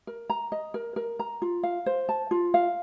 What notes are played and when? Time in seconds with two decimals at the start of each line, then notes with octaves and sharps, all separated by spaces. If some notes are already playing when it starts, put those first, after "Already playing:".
0.07 A#4
0.30 A#5
0.52 D#5
0.74 A#4
0.96 A#4
1.19 A#5
1.42 F4
1.63 F5
1.86 C5
2.09 A5
2.31 F4
2.54 F5